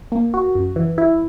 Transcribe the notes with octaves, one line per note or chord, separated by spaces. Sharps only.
A#3
F#4
F#2
E3
E4